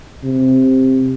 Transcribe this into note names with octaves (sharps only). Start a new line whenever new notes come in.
C3